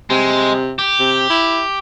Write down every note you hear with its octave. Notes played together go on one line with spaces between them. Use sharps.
C3 G#3
G4
C3
E4